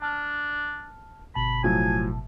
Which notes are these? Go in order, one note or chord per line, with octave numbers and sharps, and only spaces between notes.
D4 A5 F6
G1 B2 A5 B5
A2 F3 F#3 G#5